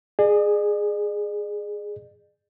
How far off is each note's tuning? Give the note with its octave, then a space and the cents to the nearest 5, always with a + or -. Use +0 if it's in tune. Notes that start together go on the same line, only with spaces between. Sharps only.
G#4 +0 D5 +45